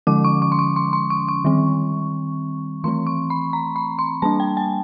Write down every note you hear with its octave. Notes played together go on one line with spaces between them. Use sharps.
D3 F3 G#3 C#4 D6
C#6
C#6
C6
C#6
C6
C6
C#6
C#6
D#3 G3 C4
E3 A3 C4 C6
C#6
B5
A#5
B5
C6
G3 A#3 D4 A5
G5
G#5